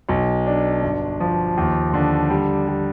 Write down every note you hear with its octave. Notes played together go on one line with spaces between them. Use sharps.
B1
D4
G1
F3
D#2
D3
G3
G3